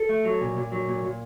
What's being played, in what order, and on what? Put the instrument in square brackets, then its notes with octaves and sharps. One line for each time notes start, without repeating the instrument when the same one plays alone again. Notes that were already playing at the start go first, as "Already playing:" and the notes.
Already playing: [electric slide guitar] A4
A3
F#3
A#2
A#2
F#3
A#2
A#2